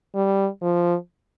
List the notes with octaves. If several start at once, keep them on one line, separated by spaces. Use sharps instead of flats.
G3
F3